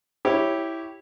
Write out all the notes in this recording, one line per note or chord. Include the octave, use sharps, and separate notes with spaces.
E4 G4 C#5